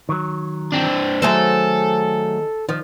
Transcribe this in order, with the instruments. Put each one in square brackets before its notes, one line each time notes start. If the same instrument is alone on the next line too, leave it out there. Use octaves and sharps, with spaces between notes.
[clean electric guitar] D#3 F#3
[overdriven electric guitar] C4 D4
[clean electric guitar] D#3 G#4 [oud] F#3 A3 C5 [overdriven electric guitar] A4
[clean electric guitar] D#3 [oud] F3